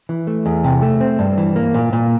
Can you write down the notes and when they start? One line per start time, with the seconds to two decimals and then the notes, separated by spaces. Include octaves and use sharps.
0.09 E3
0.27 A3
0.46 E2
0.64 C3
0.82 A3
1.01 C4
1.19 G2
1.38 E3
1.56 A#3
1.74 A#2
1.93 A#2